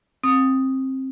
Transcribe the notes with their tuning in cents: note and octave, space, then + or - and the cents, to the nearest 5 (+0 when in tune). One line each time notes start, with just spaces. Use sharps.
C4 +20 D#6 +0